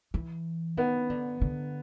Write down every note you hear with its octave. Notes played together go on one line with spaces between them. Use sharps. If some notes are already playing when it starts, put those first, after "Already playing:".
E3
D#3 B3
D3
D3